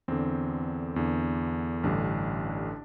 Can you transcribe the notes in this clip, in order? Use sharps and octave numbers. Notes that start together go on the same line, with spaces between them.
E2 D3 C4
E2 D3
A1 G2 D3 D4